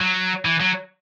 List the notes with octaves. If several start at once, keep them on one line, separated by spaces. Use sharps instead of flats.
F#3
E3
F#3